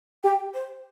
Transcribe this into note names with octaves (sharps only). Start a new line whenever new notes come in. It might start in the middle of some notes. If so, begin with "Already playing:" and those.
G4 G5
C5